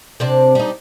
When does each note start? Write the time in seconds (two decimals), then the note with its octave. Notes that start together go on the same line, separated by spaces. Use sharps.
0.20 C3 C4 D4
0.55 G3 D#4